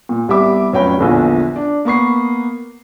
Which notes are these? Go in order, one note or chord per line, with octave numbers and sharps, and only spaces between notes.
A#2
C2 G3 B3 E5 D6
F1 F#3 C#4 G5 B5
A#1 E2 D3
D4
A#3 B3 C#6 C7